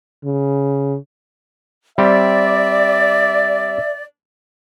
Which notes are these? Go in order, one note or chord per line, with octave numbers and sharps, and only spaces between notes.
C#3
G3 C4 G4 D5 E5